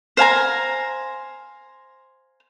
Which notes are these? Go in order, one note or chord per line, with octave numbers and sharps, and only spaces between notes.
C5 F5 G#5 A#5